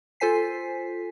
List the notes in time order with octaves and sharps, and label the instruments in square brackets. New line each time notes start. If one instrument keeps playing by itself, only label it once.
[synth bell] F4 A4 C5 G#5 B6 C7